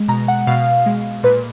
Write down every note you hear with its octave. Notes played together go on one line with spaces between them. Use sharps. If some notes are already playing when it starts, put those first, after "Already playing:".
Already playing: G#3
B2 A#5
F#5
B2 F5
G#3
A#2 B4